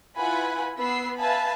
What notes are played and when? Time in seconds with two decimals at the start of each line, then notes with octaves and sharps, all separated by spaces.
0.18 E4 F4 B4 F#5 G#5 B5
0.78 B3 B5 E6 C7
1.17 B4 E5 F5 G#5 A5 B5